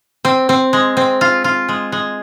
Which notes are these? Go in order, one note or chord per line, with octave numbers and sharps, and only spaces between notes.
C4
C4
G#3
C4
F4
F4
G#3
G#3